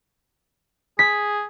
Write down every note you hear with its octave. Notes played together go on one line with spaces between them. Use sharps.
G#4 B6